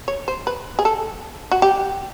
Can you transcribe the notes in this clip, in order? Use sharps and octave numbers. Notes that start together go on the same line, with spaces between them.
C#5
C5
B4
G#4
A4
F#4
G4